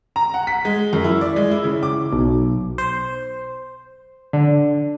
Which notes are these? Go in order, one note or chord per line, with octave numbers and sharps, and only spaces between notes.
A#5
F#5
B6
G#3
F#2
E4
D5
G#3
E4
C#3
D6
B1
C5
D3